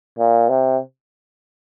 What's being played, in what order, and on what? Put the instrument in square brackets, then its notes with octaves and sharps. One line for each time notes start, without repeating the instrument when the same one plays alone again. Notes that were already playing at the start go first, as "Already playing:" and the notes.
[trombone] A#2
C3